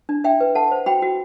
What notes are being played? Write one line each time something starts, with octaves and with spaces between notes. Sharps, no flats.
D4
D4 E5 G5
B4
A4 F#5 A5
C5
F#4 G5 B5
F#4